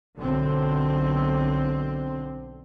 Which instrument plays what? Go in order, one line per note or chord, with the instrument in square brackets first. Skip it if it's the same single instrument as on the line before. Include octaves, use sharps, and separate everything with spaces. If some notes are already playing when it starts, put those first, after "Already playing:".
[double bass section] B1 D3 C4